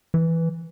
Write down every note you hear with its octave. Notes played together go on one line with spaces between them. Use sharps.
E3